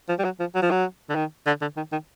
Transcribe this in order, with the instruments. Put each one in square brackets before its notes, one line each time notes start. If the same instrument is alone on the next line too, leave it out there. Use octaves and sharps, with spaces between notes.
[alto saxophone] F3
G3
F#3
F3
F#3
F3
F#3
D3
D#3
D3
D3
D#3
D#3